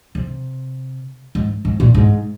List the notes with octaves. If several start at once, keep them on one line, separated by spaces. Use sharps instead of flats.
C3
G#2
G#2
A#2
G#2